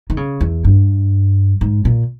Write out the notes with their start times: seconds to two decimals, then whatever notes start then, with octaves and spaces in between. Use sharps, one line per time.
0.10 D#3
0.17 C#3
0.41 E2
0.65 G2
1.61 G#2
1.85 A#2